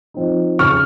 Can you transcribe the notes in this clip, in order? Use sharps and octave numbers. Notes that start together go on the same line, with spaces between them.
F3 C4 D#4
C#3 C#6 F6